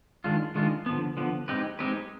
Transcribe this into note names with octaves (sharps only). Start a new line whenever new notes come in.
D#3 G#3 D4 F4
D#3 G#3 D4 F4
D3 F3 B3
D3 F3 B3
G#3 C4 D#4 G4 B4
G#3 C4 D#4 G4 B4